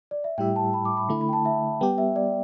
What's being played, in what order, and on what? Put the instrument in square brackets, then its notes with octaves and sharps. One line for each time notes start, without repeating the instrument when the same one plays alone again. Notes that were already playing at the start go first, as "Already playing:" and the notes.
[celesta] D5
E5
[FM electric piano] A2 G3 E4 G4 E5 [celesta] G5
[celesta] A5
B5
D6
B5
[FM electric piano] D3 A3 E4 [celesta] B5
[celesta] B5
G5
A5
E5
[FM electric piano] G3 B3 G4 [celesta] G5
[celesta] E5
D5